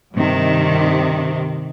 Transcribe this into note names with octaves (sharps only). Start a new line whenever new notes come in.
G2 C3 D#3